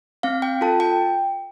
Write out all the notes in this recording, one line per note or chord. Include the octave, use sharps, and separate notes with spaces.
C4 F5
G5
F4 A4 A5
G5